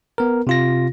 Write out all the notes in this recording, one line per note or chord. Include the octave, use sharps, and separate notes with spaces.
B3 A#4
C3 F4 A#6